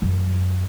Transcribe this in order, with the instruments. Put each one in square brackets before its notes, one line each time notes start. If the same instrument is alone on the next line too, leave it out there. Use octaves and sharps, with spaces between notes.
[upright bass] F#2